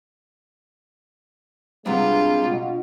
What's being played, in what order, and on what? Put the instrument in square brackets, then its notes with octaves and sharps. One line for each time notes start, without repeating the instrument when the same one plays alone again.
[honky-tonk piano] C3 G3 [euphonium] G#3 [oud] B3 D4 [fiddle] F4
[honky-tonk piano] B2 [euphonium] F4